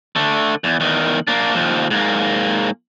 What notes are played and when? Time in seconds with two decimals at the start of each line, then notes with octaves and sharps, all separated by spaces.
0.16 D3 A3
0.64 E2
0.80 E2 D#3
1.27 A#3 D4
1.54 D#2 F3
1.91 G#2 A#3